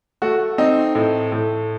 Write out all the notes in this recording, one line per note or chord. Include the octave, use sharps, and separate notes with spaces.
A3 F#4
C4 D#4
A2
A2